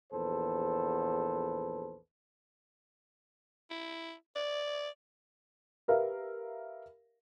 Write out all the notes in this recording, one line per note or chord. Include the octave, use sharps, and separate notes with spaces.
A#1 E2 A4 B4 C5
E4
D5
G4 A#4 B4 E5 F5